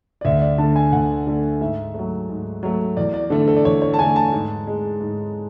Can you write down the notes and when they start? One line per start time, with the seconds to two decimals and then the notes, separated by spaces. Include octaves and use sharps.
0.21 D5
0.25 D2 E5
0.42 D5
0.58 D3 A5
0.64 A3
0.76 G#5
0.92 D2 F#5
1.27 D3 A3
1.61 G#2 E5
1.95 F#3 A3
2.29 G#2
2.63 F#3 A3
2.97 E2 D5
3.14 D5
3.30 D3 A3 A4
3.48 A4
3.57 D5
3.65 E2 C#5
3.82 C#5
3.94 A5
3.99 D3 A3 G#5
4.16 A5
4.33 G#2
4.67 G#3
5.01 G#2